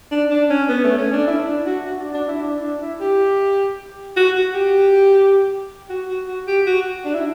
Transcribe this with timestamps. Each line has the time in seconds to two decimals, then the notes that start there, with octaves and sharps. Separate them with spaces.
0.11 D4
0.31 D4
0.50 C#4
0.69 B3
0.84 A3
0.98 C#4
1.12 D4
1.27 E4
1.47 D4
1.66 F#4
1.85 F#4
1.99 D4
2.14 D4
2.28 E4
2.43 D4
2.62 D4
2.81 E4
3.00 G4
4.16 F#4
4.35 F#4
4.54 G4
5.89 F#4
6.08 F#4
6.28 F#4
6.47 G4
6.66 F#4
7.05 D4
7.14 E4